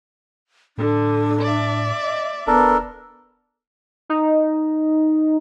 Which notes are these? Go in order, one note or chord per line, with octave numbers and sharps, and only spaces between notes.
A2 D3 D4
D5 E5
D#5
E1 B3 D4 A4 A#4
D#4